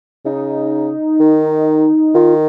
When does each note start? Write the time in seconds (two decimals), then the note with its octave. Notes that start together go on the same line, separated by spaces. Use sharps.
0.25 C#3 D#4
1.20 D#3
2.15 D#3 F4